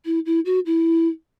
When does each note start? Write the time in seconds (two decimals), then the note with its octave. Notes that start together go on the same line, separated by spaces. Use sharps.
0.05 E4
0.26 E4
0.46 F#4
0.66 E4